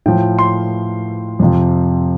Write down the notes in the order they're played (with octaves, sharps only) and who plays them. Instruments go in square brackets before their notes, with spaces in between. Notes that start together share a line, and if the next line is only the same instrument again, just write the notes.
[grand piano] A2 F3 G5
C6
F2 C3 F3